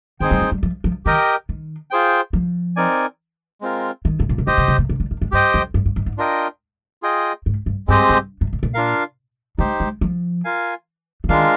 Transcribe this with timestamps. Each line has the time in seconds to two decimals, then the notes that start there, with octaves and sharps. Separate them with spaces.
0.20 D#3 C4 D#4 G#4 C5 G5
0.31 G3
0.42 A#3
0.52 G3
0.63 F3
0.84 F3
1.05 D#3 G4 A#4 D#5 G5
1.49 D#3
1.91 F4 G#4 C5 G5
2.33 F3
2.76 C4 D#4 A#4 D5 G#5
3.61 G#3 C4 F4 A#4
4.05 D#3
4.20 G#2
4.29 A#2
4.38 C3
4.47 D3 G4 C5 D#5
4.58 C3
4.68 C3
4.78 A#2
4.89 C3
5.00 D3
5.11 D#3
5.21 G#2
5.32 G2 G4 C5 D#5 G5
5.54 F2
5.74 G2
5.86 G2
5.96 G#2
6.06 G#2
6.18 D4 F4 A#4 D#5 G5
7.02 F4 G#4 D#5 G5
7.46 G#2
7.66 G2
7.88 G2 G#3 C4 G4 C5 D#5
8.09 G2
8.41 G#2
8.53 A#2
8.63 A#2
8.74 D4 F4 A#4 F5
9.58 G#3 D#4 G4 C5
9.80 G#3
10.01 F3
10.44 F4 A#4 F5 G#5
11.24 D3
11.29 D#3 G#3 D4 F4 A#4 F5